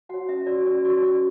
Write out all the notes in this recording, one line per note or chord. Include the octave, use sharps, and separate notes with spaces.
F#4 C#5 F#5
C#4 E5
F#4 C#5 D5
C#4 D5
F#4 C#5 D5
C#4 D5